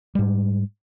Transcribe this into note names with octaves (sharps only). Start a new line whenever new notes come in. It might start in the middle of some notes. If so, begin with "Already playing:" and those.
G#2 G3